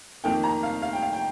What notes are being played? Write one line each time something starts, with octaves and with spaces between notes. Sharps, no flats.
F2 D#3 A#3 G5
A#5
F5
F5
G5
F5
G5